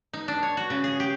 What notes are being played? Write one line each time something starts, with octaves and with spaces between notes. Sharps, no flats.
D#4
D4
C#5
F#4
C#3
G#4
G4